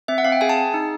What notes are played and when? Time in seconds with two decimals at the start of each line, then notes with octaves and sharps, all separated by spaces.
0.08 C4 E5
0.18 F#5
0.24 C4 F5
0.32 G5
0.41 G#4 G#5
0.49 A5
0.58 G#4
0.74 D#4